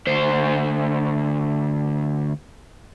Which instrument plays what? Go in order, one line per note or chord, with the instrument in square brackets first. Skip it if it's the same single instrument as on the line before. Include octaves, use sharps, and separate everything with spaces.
[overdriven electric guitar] D2 C5